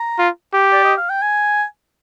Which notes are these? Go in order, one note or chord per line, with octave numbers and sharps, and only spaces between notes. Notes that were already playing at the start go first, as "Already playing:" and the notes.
Already playing: A#5
F4
G4
D5
D#5
F5
G5
G#5